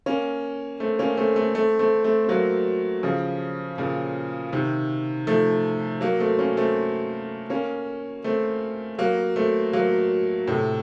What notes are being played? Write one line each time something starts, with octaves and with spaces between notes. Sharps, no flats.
A#3 C#4
A3 C4
A#3 C#4
A3 C4
A3 C4
A3 C4
A3 C4
A3 C4
C4
F#3 A#3
C#3 F3
A#2 C#3
C3 D#3
F3 A3
F#3 A#3
A3 C4
A#3 C#4
A3 C4
A#3 C#4
A3 C4
F#3 A#3
A3 C4
F#3 A#3
A2 C3